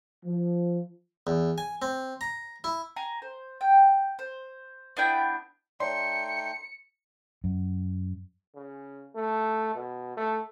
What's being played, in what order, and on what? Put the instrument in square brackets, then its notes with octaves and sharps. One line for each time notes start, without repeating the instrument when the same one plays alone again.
[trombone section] F3
[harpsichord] E2
G#5
C4
A#5
E4
[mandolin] G#5 A#5
C5
G5
C5
B3 D4 E4 G5
[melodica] A3 D#4 G5 [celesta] C#5 D5 [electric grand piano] C6 [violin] C#7
[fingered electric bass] F#2
[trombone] C#3
A3
B2
A3